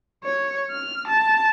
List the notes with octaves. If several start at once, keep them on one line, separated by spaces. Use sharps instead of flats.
C#5
F6
A5